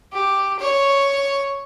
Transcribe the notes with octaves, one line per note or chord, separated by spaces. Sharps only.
G4
C#5